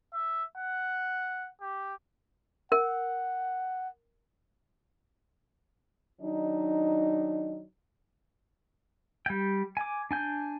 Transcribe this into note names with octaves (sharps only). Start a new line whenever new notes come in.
E5
F#5
G4
A#4 F#5
D#3 F#3 D4 D#4
G3 G5
G#5 D6
D4 G#5 G6